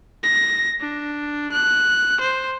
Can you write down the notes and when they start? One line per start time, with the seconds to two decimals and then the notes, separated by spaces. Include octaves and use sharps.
0.23 A#6
0.80 D4
1.52 F#6
2.21 C5